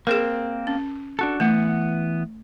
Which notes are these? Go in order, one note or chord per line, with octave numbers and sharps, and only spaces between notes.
A#3 C4 G#4 A#4
C#4
D4 F#4 A4
E3 A3 B3 F#5